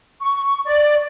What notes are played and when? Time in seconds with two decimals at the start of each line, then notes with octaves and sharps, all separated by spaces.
0.22 C#6
0.66 D5